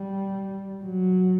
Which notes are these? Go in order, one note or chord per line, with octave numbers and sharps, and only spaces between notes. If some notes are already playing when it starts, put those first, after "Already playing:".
Already playing: G3
F#3